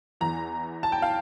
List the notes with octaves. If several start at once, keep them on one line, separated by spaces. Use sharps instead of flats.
E2 E3 A#5
A5
G5
F5